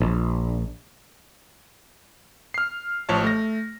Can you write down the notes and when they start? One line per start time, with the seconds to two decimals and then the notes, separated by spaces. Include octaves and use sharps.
0.01 A#1
2.54 F6 C7
3.09 A1 F3 C#5 A5
3.24 A3 A#6